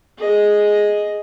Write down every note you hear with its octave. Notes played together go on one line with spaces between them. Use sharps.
G#4 D#5